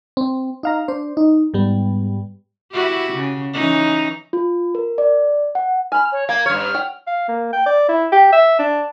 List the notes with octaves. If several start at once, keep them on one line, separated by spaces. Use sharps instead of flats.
C4
D#4 F5 A#5
D4 C5
D#4
G#2 G3 B3
E4 F#4 G4
C#3
E3 C#4 D#4
F4
A#4
D5
F#5
G#5 B5 F6
C#5
A#3 F5 G#6
G2 C#5 F6
C#5 F#5 G5
F5
A#3
G5
D5
E4
G4
E5
D4